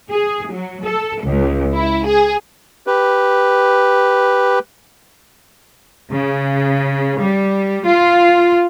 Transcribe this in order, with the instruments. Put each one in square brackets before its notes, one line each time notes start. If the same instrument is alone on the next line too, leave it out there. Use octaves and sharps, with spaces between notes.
[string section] G#4
F#3
A4
C#2
E4
G#4
[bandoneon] G4 B4
[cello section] C#3
G3
F4